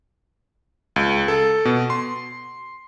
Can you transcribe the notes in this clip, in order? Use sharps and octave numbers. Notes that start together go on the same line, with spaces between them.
C#2
A4
B2
C6